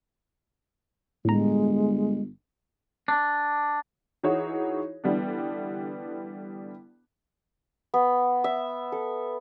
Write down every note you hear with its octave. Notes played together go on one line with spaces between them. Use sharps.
G1 A2 G#3 A#5
D4
E3 D#4 F#4 G#4 C#5
D3 E3 G3 B3 D4
B3
E5
A4